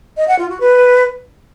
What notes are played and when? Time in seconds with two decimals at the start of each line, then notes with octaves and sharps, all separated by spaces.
0.17 D#5
0.28 F#5
0.39 F4
0.49 F#4
0.60 B4